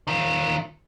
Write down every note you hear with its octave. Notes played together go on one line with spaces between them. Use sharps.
D#3 F4